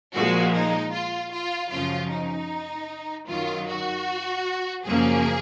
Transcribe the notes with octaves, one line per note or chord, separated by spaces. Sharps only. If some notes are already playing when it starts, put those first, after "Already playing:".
A#2 F3 G#3 F#4
D#4
F4
F4
F#2 C#3 F3 F4
D#4
F#2 D#3 F#3 F4
F#4
F#2 C#3 F3 A#3 G#4